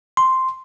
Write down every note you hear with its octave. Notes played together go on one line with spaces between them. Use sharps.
C6